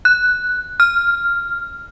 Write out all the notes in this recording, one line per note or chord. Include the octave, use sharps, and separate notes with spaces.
F#6
F6